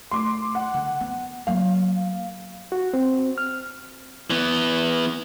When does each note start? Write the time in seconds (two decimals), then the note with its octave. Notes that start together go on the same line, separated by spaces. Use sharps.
0.11 A3 C6 D6
0.55 F#5
0.74 D3
1.00 B3
1.47 F#3 A#3 F5
2.72 F#4
2.94 C4
3.38 F6
4.30 E3 B3